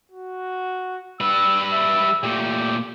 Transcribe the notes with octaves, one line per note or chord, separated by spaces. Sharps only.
F#4
G3 B4 E6
E5
A#2 A3 G4